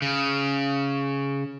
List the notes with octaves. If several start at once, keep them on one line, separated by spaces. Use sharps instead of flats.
C#3